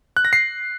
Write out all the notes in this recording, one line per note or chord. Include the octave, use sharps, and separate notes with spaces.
F#6
A#6
C7